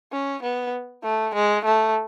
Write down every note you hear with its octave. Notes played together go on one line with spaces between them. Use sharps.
C#4
B3
A3
G#3
A3